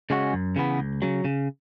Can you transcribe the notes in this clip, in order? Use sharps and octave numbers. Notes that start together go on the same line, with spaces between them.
C#3 G#3 C#4 F#4
F#2
C#3 E3 B3
C#2
C#3 F#3
C#3